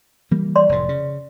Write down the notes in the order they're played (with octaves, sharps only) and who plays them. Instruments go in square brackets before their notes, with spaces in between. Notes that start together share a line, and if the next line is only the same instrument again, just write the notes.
[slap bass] E3 G3 A#3
[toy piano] D5 C6
[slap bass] F1 A2
C#3